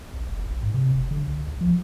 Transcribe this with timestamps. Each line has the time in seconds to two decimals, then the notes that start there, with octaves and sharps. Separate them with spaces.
0.13 B1
0.29 F1
0.46 A#1
0.62 G#2
0.74 C3
0.94 F1
1.11 D3
1.27 C2
1.48 C#2
1.61 F3